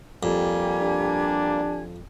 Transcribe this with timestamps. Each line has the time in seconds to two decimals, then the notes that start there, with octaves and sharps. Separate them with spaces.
0.23 F2 G3 A#3 G4 G#5 G#6
0.82 D4